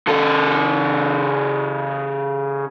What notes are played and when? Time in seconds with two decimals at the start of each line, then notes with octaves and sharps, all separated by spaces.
0.08 C#3 A4